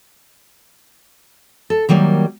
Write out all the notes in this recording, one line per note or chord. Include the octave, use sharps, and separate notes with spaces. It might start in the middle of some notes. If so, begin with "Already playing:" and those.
A4
D#3 F#3 G3 A#3